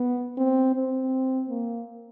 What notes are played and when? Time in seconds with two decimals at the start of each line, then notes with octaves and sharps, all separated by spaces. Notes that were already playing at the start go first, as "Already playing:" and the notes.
Already playing: B3
0.37 C4
0.75 C4
1.50 A#3